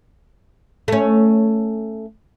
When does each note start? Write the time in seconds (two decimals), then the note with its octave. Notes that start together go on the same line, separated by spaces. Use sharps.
0.88 A3 C#4